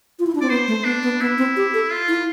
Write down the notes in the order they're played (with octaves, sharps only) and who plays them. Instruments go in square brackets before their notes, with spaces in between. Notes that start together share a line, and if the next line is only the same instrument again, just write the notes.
[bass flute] F4
E4
D4
[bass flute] C4 [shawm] D5
[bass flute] B3 [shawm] C5
[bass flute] A3
[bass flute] B3 [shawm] D4
[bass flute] B3
[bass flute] B3 [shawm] E4
[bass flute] C4
G4
A4
[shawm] F4
[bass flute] E4